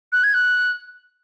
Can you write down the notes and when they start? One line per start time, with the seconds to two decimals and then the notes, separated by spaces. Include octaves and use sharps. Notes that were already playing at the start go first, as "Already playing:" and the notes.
0.12 F#6
0.24 G#6
0.34 F#6